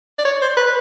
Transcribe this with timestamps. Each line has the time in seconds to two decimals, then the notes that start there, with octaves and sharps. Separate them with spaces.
0.18 D5
0.25 C#5
0.42 C5
0.57 B4